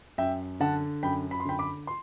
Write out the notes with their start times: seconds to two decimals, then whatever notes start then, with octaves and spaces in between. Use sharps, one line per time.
0.18 F#2 E5 G5
0.60 D3 F#5 A5
1.03 F#2 G5 B5
1.31 B5
1.40 C6
1.45 D3 G5 B5
1.59 B5 D6
1.87 C6